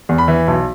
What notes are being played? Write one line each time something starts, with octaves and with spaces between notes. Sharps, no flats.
E2
B5
E3
B1